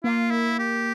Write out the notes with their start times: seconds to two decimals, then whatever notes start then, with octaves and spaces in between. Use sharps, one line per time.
0.04 A#3 F4
0.31 E4
0.59 G4